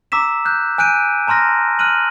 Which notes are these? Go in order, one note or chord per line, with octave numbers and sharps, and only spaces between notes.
A#5 D6 E6 B6 E7
F#6 G6
G#5 F#6 G6 D7 D#7
A5 A#5 C6 F6 A#6
F6 F#6 D#7 F#7